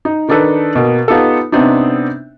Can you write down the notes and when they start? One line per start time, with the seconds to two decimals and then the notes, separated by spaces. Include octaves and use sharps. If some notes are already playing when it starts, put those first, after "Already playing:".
0.05 D#4
0.29 D#3 D4 D#4 A4 B4
0.75 B2 A#3
1.08 B3 D#4 F4 G4 A4
1.52 C3 B3 C4 D4 D#4